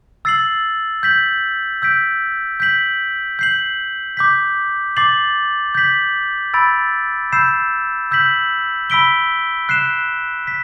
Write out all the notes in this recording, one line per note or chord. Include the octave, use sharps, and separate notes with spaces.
E6 A6 C7 F#7
G6 B6 F#7
E6 G6 B6 D7
G6 B6 F#7
G6 C7 F#7
D6 G6 B6
D6 A6 C7 F#7
G6 B6 F#7
B5 E6 A6 D7
B5 E6 G6 C7 E7
E6 G6 B6 F#7
B5 E6 B6 D7 G7
F#6 C7 E7
B6